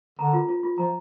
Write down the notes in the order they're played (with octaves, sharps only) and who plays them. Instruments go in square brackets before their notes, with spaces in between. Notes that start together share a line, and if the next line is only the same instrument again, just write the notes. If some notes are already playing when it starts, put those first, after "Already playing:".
[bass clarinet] D3 [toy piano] A#5
[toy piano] F4
F4
F4
[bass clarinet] F3 [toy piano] A#5